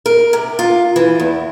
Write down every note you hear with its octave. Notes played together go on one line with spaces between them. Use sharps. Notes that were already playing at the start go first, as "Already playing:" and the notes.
A#4
C3
F4
E3
E2